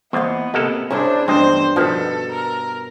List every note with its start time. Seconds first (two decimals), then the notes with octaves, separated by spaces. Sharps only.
0.13 E2 A#3 B3 C5 D#5 F5
0.54 A2 C3 G#3 A#3 G4 A4
0.91 C2 C#4 D4 E4 G#4 C5
1.28 E2 G2 A3 C4 C5 D#5
1.76 B2 D#3 F3 A4 B4 F#5 A5
2.31 A#4